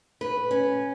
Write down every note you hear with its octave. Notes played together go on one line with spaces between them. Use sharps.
B4
C#4